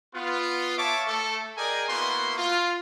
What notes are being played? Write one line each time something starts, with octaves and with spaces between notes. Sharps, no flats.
B3 F4
C#5 E5 F5 A5 C#6 D6
A3 A4
G#4 A#4 D5 D#5 G5 G#5
A#3 B3 E4 F#4 C6
F4